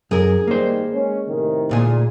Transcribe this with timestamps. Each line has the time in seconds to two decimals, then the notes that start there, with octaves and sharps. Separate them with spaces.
0.11 F#2 G#4 A#4
0.48 G#2 D#3 G3 A#3 C5
0.94 G#3 C#4
1.28 A2 C3 D#3
1.69 D2 A#2 G#4